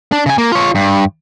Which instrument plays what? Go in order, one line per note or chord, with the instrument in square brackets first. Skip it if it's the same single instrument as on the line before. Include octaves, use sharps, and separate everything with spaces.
[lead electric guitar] D4
C#3 G#5
A#3
F4 C#5
G2